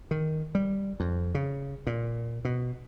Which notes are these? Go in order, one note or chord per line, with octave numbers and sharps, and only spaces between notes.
D#3
G3
F2
C#3
A#2
B2